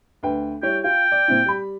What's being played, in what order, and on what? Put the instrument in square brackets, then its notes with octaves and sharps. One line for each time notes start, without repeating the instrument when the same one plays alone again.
[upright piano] D2 B4 G5
[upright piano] G3 E4 C#5 [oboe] G5
[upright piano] F4 [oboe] G5
[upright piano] D5
A#2 C4 E4
G3 B5